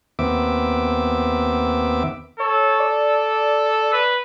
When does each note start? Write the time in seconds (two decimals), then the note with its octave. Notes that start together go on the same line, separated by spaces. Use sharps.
0.19 D#2 B3 C4 E5 D6
2.40 A4 C#5
2.80 D5
3.93 B4